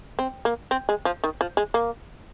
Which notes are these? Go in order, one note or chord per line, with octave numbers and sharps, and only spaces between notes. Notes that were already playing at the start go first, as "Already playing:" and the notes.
C4
A#3
C4
G#3
F3
D#3
F3
G#3
A#3